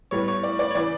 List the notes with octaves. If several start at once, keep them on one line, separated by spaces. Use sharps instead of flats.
A2 G3 B3 C#5
C#5
D5
D5
C#5
C#3 E3 D5